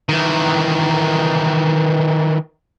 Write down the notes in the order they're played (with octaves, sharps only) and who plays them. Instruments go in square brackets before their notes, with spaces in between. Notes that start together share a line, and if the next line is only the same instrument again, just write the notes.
[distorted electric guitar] D#3 E3